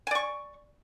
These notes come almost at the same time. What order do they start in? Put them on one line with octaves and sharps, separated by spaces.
G#5 D5 C#6